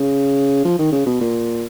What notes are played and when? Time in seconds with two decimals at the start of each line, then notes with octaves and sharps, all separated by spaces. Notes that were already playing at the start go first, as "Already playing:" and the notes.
Already playing: C#3
0.65 F3
0.79 D#3
0.92 C#3
1.06 B2
1.21 A#2